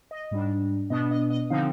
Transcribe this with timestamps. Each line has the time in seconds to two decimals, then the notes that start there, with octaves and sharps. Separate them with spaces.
0.11 D#5
0.31 G#2 G3 D4
0.90 B2 B3 D4 D#5
1.11 D#5
1.30 D#5
1.50 D3 F3 C4 D#4 F5